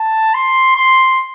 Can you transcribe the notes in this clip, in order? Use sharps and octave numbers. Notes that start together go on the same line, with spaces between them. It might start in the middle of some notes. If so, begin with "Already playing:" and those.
Already playing: A5
C6
C6